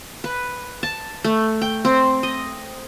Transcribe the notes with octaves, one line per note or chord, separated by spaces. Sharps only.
B4
A5
A3
G5
C4
D#5